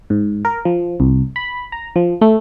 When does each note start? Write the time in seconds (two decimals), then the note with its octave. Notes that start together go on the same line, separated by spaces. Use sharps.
0.10 G#2
0.45 A#4
0.65 F3
1.00 C2
1.36 B5
1.72 A#5
1.96 F3
2.21 A3